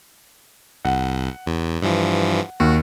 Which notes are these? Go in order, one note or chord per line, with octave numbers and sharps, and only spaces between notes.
C2 F#5
E2
G2 E3 F3
D#2 F#4